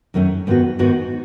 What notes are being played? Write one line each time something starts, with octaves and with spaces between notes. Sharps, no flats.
F#2 D#3 A3 C#4
G#2 D#3 G#3 B3 F#4
G#2 D#3 G#3 B3 F#4